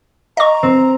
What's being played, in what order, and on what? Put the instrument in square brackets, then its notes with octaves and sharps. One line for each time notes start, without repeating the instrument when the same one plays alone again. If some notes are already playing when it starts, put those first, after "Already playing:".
[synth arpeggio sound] D#5 C#6 [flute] A#5
[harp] C4